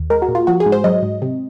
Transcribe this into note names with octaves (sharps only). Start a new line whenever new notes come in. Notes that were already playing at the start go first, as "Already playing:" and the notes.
Already playing: D#2
G#3 A#4
F#4
A#2
F4
F3 F#4
G#4
G#2
C5
F#3 D#5
G#2
C3